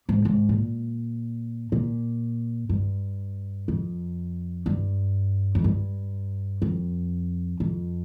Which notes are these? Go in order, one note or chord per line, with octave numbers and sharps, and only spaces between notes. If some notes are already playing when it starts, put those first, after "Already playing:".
G#2
G#2
A#2
A#2
G2
F2
G2
F2
G2
F2
F2